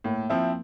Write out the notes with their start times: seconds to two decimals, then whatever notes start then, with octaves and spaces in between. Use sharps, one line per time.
0.04 A2 A#3
0.30 F3 C4 E4